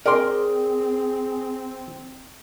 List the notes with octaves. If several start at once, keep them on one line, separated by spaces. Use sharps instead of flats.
C4 G#4 A#4 D5 G5 C6